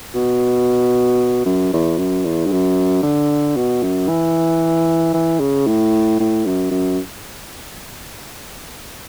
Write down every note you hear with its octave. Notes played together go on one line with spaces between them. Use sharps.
B2
F#2
E2
F#2
E2
G2
F#2
D3
B2
F#2
E3
E3
C#3
A2
A2
F#2
F#2